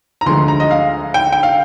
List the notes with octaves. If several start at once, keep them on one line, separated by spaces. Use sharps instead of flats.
A#5
D2 D3 F3 G#3 C6
A#5
D#5
F5
G5
G5
F5